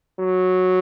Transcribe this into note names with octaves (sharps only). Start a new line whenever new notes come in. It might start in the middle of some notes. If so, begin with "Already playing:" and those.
F#3